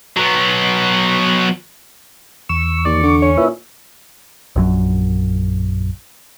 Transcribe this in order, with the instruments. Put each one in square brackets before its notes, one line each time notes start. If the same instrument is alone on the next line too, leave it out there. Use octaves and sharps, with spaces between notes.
[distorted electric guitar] F#3 B3
[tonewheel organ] E2 C#6 [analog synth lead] E6
[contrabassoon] D#2 [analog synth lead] D5
[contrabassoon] D3
[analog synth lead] C#4
[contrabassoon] A#2 [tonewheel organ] E4 B4 E5
[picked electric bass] A#1 F#2 F#3